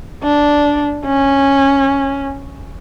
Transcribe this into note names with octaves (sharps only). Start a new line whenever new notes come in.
D4
C#4